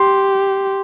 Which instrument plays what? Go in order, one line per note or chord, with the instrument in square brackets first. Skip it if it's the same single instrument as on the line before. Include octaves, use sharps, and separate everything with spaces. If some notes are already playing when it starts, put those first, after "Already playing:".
Already playing: [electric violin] G4 [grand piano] C6